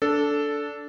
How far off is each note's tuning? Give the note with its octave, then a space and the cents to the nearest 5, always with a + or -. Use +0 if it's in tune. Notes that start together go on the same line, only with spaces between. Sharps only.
D4 -15 A4 +0